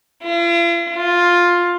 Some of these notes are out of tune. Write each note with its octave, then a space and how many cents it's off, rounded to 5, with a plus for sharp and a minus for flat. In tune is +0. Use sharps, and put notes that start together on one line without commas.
F4 -45
F4 +10